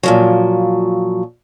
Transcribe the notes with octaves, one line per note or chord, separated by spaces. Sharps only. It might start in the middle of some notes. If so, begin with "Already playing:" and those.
A#2 F3 F#3